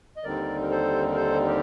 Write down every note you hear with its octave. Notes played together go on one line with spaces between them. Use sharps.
D#5
D#2 D3 G3 C4 D#4 A#4 D5
A#4
A4 C5
A#4
A4 C5
G4 A#4